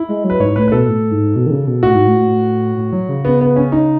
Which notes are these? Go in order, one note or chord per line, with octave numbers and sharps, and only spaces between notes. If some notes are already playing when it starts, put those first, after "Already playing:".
Already playing: E4
G#3
F#3
B4
G#2 C#5
A2 B4
B4
B2 A4
A2
G#2
B2
D#3
C#3
B2
A2 F#4
G#2
A2
A2
A2
A2
F#3
C#3
C#3 B3
B3
C#4
D#4